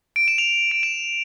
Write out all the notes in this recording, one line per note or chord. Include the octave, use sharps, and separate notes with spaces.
D7
E7
F7
D7
E7